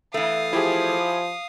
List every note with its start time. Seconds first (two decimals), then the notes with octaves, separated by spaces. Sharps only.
0.14 E3 A3 F5 D#6
0.53 F3 E4 G4 G#4